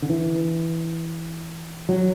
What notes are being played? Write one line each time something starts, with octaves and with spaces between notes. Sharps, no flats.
D3
E3
F#3